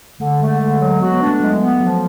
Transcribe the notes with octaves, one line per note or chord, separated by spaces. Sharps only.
D3 A3
G#3 A3
D3 G#3
F#3
B3 F#4
B3
D4
A3
F#3 G#3
F#3
B3
F3 F#3